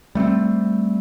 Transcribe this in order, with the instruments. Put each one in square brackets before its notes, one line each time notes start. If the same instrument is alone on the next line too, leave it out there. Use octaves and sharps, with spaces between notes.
[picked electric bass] G3 A3 B3 C4